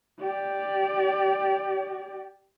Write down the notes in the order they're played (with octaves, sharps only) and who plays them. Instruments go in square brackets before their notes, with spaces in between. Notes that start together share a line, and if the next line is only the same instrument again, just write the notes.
[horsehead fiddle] G4 D5